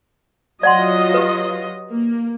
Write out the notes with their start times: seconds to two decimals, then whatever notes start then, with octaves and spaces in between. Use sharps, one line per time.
0.63 F#3 F4 D5 D#5 F#5 C6
1.14 G4 B4
1.89 A#3